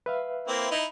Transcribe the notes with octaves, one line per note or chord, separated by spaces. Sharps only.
B4 E5 F5
A#3 C4 E4
D#4 E4